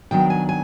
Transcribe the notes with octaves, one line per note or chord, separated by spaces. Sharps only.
D#3 F#3 B3 D4 G5
G#5
G#5